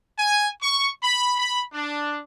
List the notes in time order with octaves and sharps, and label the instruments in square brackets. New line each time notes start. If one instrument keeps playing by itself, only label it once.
[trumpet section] G#5
C#6
B5
B5
D4